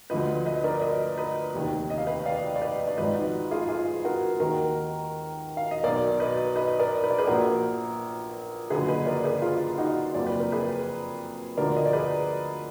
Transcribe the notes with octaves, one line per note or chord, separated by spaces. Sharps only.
D2 D3 F3 B4 D#5
B4 D#5
A#4 D5
B4 D#5
B4 D#5
F1 D#2 D#3
D#5
F5
B4 D#5
D5 F5
D5
B4 D#5
D5
G#1 G#2 F3 B4 D#5
D#4 F#4
F4 G#4
F4 G#4
F#4 A#4
D#2 D#3 F#4 A#4
F5
D#5
B1 B2 A#4 D5
B4 D#5
B4 D#5
A#4 D5
B4
D5
G#4 B4
A#1 A#2 F3 F#4 A#4
F#1 F#2 D3 F3 G#4 B4
B4 D#5
A#4 D5
G#4 B4
F4 G#4
D#4 F#4
F#1 F2 F3 D5
B4
A#4
G#4 B4
D2 D3 F3 A#4 D5
D#5
D5
G#4 B4